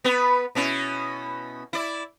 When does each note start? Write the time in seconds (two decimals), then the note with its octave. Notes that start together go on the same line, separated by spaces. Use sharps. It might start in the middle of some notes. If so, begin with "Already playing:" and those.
0.04 B3 B4
0.55 B2 C#4 E4
1.73 E4 D5